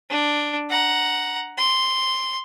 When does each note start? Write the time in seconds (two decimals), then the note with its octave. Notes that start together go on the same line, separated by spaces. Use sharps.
0.10 D4
0.70 F#5 A#5
1.58 C6